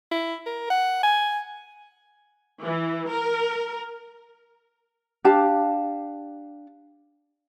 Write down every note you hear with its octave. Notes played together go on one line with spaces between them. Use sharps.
E4
A#4
F#5
G#5
E3
A#4
D4 G4 F5 A5